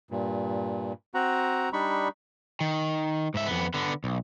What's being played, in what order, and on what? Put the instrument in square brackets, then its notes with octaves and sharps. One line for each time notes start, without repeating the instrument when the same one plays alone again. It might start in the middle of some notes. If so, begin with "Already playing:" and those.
[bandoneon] G2 A#2
C4 F#4 F#5 A#5
G3 D4 D#4 B5 C#6
[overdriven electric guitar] D#3
G#2 E5
F2 B3
D3 B3
B1